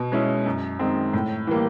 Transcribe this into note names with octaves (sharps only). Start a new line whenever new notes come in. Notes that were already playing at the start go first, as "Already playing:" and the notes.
Already playing: B2
G#3 C#4 E4
F#2
D#3 G#3 C4
A2
E3 G3 A#3